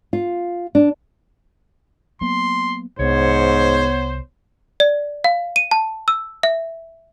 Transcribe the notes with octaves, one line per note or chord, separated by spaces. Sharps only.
F4
D4
F#3 A#3 B3 C6
C2 G#2 B3 C5 C#5
D5
F5
D#7
A5
E6
E5